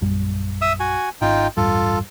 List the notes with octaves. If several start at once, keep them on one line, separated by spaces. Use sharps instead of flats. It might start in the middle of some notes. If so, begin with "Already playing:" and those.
A#1 F#2 G3
E5 D#6 E6
F#4 G#5
G#1 C#4 D#4 F4 G5
A1 E2 G2 F4 A4